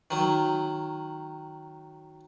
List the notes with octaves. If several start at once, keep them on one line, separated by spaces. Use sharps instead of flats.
D#3 F#3